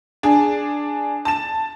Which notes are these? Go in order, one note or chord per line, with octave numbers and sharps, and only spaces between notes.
D4 G#4
A5 E7